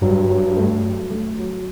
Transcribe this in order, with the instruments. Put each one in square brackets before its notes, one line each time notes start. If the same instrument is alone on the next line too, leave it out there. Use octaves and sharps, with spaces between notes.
[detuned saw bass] G2 [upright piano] F#3
[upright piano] F#3
A3
F#3
A3
F#3